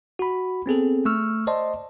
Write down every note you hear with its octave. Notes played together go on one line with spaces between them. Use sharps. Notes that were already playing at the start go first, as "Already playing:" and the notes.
F#4 B5
B3 C4 G#4 A4
A3 C#6 E6 F6
C5 D5 D#5 A5 C6